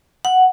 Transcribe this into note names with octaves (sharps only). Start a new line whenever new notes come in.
F#5